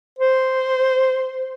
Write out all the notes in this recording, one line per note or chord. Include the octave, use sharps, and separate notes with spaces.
C5